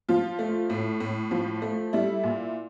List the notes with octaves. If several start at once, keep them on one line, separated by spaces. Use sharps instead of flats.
F3 F4
A3
A2
A2
F3
A3
G3 E4
A#2